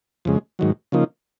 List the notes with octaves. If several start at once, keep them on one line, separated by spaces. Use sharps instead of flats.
F2 C#3 G#3
G#2 D#3 F#3
C#3 F3 A#3 D#4